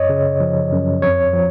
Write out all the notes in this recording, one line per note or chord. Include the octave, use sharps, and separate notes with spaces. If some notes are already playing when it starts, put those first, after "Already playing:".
Already playing: F#2 C#5 D#5
C#3
F3
F#2
F2 C#5
F3